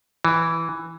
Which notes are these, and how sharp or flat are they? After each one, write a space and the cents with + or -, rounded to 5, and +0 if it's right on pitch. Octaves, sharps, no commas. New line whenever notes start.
E3 +0